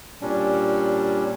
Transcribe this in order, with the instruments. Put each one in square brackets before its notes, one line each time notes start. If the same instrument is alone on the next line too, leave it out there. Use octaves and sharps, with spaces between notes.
[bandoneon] A#2 G3 C#4 D4